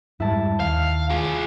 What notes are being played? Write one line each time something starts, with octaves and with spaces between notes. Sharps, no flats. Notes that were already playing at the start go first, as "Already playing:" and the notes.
F2 G#2 G3 E4 A5
D#2 F5
F4 G#4